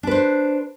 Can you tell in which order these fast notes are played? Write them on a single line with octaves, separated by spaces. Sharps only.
D4 B4 C5